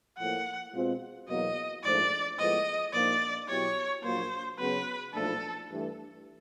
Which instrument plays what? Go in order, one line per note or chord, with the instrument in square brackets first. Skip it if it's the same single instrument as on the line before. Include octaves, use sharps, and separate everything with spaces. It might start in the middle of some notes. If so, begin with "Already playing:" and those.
[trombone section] A2 F3 A#3 [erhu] F#5
[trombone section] B2 G#3 C4 F4
[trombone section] E2 B2 F#3 A#3 [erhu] D#5
[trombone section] A#1 G#2 F3 A3 [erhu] D5
[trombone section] A2 F3 G#3 B3 [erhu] D#5
[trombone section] A#1 A#2 F3 A#3 D#4 [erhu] D5
[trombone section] B2 F#3 B3 E4 G4 [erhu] C#5
[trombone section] A#1 A#2 F#3 A#3 [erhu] C5
[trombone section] C#3 F#3 B3 [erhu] B4
[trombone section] B1 A#2 F3 A3 D4 [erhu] A4
[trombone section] G2 E3 A3